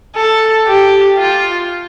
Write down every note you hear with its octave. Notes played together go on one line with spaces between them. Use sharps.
A4
G4
F4